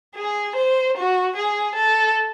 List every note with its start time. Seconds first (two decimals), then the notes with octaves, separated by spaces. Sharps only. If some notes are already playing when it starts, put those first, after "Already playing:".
0.15 G#4
0.55 C5
0.96 F#4
1.35 G#4
1.75 A4